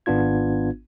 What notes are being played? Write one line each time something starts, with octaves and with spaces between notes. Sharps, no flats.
G#1 B3 D4 F4 G#6